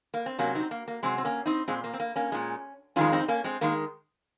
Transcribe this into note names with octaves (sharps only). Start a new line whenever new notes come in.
A#3
C4
C3 F#3 A#3 C#4
C4 D#4
A#3
A#3
C3 F#3 G#3 C4
C4
A#3 C#4
C4 D#4
A#2 G#3 C4
A#3
C4
A#3
A#3 C#4
A#2 G#3
F2 D#3 G#3 C#4 F4
C4 D#4
A#3 C#4
G#3 C4
D#3 G#3 A#3